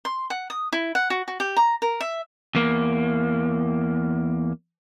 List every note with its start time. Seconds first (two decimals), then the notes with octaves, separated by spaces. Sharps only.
0.05 C6
0.30 F#5
0.50 D#6
0.73 E4
0.95 F#5
1.10 F#4
1.28 F#4
1.40 G4
1.57 A#5
1.82 A#4
2.01 E5
2.55 E2 A#3